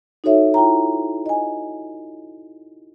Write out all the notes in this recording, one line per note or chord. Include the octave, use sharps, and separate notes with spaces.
D#4 F#4 A4 C#5 E5
E4 F4 G5 A#5
D#5 G#5